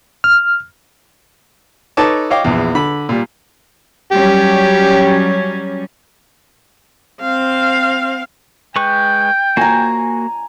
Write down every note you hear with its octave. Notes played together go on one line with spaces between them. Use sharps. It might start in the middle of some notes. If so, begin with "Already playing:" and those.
F6
D#4 A4 B4 C#5 A5 D6
C#5 D#5 F5 G5 D6
A#1 E2
D3 B5
A#2 G3
F#3 G3 C#4 G4
C4 F5
G#3 B4 G5 C#6
A#3 F#4 G#5 A#5